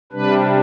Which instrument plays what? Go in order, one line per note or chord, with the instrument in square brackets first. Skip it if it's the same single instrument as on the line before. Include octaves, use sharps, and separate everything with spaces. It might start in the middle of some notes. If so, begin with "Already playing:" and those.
[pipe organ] C3 G3 D4 B4